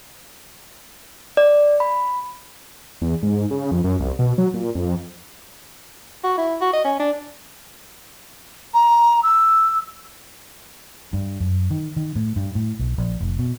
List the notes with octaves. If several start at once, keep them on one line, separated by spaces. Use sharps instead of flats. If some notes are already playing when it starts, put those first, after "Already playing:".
D5
B5
E2
G#2
C#3
F2
F#2
C2
B2
F#3
A#2
F2
F#4
E4
F#4
D#5
C#4
D4
A#5
E6
G2
F#2
D#3
D#3
A2
G2
A2
B1
A#1
F1
B2